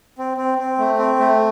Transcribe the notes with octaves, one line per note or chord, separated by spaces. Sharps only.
C4
C4
C4
A3
C4
A3